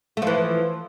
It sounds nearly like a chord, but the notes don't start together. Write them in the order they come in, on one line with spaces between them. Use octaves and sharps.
A3 F3 E3